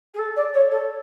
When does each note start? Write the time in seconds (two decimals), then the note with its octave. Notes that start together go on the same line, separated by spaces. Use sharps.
0.14 G#4
0.18 A4
0.36 D5
0.53 C#5
0.71 A4